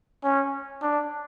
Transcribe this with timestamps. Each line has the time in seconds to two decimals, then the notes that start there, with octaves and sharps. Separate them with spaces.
0.24 C#4
0.82 D4